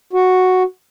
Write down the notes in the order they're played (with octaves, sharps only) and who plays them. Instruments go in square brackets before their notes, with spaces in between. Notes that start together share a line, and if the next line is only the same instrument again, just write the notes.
[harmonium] F#4